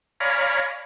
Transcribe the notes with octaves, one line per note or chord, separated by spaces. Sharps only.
C#5 D5 F5 G#5 A#5 B5